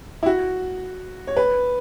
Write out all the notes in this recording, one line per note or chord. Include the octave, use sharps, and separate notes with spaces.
E4
F#4
C#5
B4